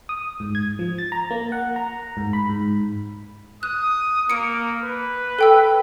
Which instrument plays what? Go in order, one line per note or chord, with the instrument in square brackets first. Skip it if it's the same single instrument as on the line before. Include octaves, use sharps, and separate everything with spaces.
[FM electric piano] D#6
G#2
G#6
F3
A6
A#5
A#3
F#5
A#5
G#2
B5
G#2
[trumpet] D#6 [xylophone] F#6
[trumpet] A#3 [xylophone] C#7 D7
[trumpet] B4
[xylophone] A4 G5 E6